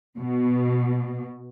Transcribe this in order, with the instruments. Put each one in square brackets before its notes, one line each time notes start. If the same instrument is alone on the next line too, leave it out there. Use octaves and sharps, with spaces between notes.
[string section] B2